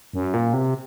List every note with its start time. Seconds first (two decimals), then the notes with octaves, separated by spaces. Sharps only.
0.13 F#2
0.34 A#2
0.53 C3